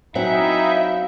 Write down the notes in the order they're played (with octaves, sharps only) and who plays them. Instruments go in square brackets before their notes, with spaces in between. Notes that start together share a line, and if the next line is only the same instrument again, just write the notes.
[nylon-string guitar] F#3 C4 C#4 [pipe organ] D#4 E4 [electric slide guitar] E5
[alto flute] F5